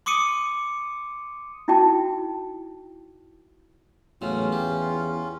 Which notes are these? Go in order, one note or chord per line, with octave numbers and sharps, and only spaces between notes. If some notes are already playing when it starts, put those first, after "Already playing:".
C6 D6 D#6 C#7 D#7
D#4 E4 F#4 G5 A5
E2 A2 F#3 C#4 F4
G4